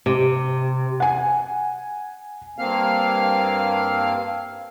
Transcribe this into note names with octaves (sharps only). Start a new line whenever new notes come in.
C3
F#5 G#5
G2 A#3 C4 F5 F6